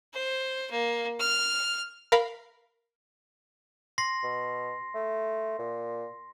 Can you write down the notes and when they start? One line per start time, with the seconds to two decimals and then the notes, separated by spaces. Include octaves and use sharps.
0.14 C5
0.71 A#3
1.20 F6
2.12 A#4 F5 B5
3.98 C6 A#6 C7
4.23 B2
4.95 A3
5.59 A#2